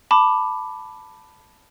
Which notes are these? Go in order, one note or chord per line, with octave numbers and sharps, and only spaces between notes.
A5 B5 D6